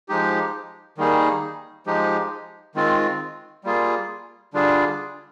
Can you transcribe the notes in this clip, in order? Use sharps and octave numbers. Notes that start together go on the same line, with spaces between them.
F3 G#3 D#4 G4
D#3 G3 A#3 D#4 G#4
F3 G#3 D#4 G4
D#3 G#3 C4 F4
G3 A#3 F4 G#4
D3 G3 D4 F4 G#4